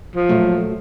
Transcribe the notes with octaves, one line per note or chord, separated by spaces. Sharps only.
F3
A#2 F#3 A3